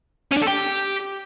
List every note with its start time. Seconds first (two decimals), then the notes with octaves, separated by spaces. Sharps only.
0.31 C#4
0.37 D4
0.42 A4
0.47 G4